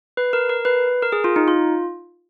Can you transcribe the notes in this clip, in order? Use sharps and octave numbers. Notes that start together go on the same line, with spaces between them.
B4
A#4
A#4
B4
A#4
G#4
F4
D#4
F4